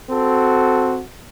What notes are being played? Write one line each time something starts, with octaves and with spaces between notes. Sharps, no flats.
C4 F#4 A4